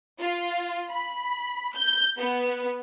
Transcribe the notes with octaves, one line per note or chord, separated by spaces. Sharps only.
F4
B5
G6
B3